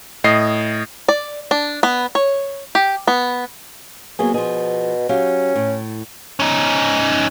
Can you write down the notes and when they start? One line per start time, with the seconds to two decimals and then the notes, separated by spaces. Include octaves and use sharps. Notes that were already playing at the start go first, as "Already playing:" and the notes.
0.24 A2 D#5 C7
1.08 D5
1.51 D4
1.83 B3
2.15 C#5
2.75 G4
3.07 B3
4.19 F#3 A#3 B3 G#4
4.34 B2 F3 G#4
5.09 F#3 C#4 G4 F5
5.55 A2
6.40 C#4 D#4